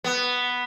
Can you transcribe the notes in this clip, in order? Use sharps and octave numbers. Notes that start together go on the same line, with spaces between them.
B3